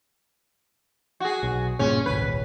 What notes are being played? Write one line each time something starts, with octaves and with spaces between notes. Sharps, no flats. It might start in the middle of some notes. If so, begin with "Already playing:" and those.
F#4 G#4
B1
G2 A#2 C#3 C#4
D#1 G#1 C#2 B4